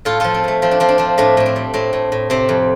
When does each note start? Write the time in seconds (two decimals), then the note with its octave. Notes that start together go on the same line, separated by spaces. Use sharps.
0.05 A2 F4 A4
0.20 F3 F4 A4
0.34 C4
0.44 A2 A3
0.62 F3 C4
0.71 D4
0.80 F3 C4
0.89 D4
0.98 F3 C4
1.18 A2 A3 D4
1.37 A2 D4
1.46 C4
1.56 G3
1.74 A2 C4
1.93 A2
2.12 A2
2.30 C3 C4
2.49 F2